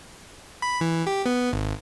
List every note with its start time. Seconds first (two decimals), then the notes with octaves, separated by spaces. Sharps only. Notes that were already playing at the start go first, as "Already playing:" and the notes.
0.62 B5
0.81 E3
1.07 G4
1.26 B3
1.53 G#1